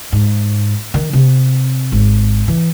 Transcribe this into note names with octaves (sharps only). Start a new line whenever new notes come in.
G#2
D#3
C3
G#1
E3